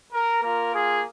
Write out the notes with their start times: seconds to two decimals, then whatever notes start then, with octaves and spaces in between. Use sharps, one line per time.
0.13 A#4
0.43 A#3 F4 A#4
0.72 G#4